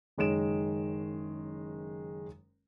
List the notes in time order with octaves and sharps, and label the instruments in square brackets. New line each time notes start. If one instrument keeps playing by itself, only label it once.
[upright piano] F#1 D#3 G#3 C#5 D7 E7